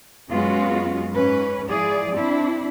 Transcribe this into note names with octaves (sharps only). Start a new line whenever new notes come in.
F#2 G#3 B3 C#4 F4 F#4
G#2 C#4 B4
F3 E4 G#4 D5
C4 D4 E4